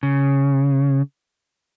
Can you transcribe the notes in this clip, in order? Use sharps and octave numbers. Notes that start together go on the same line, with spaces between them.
C#3